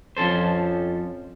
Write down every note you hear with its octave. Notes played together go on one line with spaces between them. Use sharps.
F2 F3 C#4 A4 C5